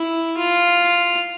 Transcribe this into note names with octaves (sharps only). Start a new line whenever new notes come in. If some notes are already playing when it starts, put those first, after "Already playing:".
Already playing: E4
F4